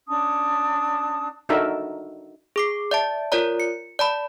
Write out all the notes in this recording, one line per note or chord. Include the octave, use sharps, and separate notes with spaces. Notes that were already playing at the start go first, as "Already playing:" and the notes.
C#4 D4 A5 D#6
D4 D#4 F#4 A4 A#4 E5
G#4 D6 C7
D5 E5 A5
F4 A#4 C#5 D5 A#5
C#7
D5 A5 B5